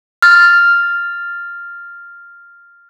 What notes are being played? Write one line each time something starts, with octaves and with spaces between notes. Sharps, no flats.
F6 A6